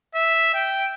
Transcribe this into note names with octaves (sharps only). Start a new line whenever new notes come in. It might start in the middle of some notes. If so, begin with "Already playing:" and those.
E5
G5